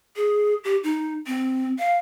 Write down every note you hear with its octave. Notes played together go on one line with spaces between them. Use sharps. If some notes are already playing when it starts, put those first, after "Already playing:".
G#4
G4
D#4
C4
F5